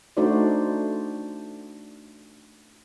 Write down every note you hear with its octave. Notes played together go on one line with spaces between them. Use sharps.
A3 D4 D#4 F#4 C5 D5